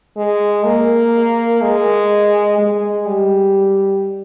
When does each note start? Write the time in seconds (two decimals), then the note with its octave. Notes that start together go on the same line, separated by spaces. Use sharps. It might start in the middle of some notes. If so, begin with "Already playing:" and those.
0.17 G#3
0.64 A#3
1.62 G#3
2.58 G#3
3.06 G3